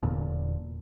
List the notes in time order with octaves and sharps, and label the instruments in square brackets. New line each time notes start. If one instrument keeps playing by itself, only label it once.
[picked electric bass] E1 E2 A#2 D3